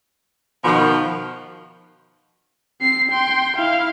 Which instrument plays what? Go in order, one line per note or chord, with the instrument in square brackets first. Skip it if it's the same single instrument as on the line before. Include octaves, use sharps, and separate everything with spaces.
[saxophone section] B2 D#3 F3
[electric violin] C4 C7
G5 C6
E4 F5